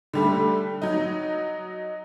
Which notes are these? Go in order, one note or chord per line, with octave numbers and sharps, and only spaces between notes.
D3 G3 A3
F#3 D#4